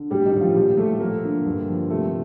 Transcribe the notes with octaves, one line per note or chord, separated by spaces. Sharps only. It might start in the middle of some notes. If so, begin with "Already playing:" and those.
Already playing: D3
A2 G3 G4
D#3 D#4
A2
F3 F4
A#2 G3 G4
G3 A3 A4
F3 A#3 A#4
D3
G2
F3
C3 A3 A4